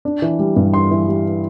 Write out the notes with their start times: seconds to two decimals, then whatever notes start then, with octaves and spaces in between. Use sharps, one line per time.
0.05 D4
0.22 E3
0.39 G3
0.56 G2
0.74 D4 C6
0.91 E3
1.08 G3